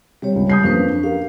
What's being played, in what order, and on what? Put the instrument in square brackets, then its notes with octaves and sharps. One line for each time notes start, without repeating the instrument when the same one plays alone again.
[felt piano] C3 [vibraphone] G3 G4 C#5
[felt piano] C#2
D#6 G6 C7
[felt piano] F2 A#3 [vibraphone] C#4 D4 B4
[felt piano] G4 A#4 [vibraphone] F5